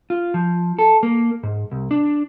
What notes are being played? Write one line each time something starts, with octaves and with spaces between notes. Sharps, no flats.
F4
F3
A4
A#3
G#2
C2
D4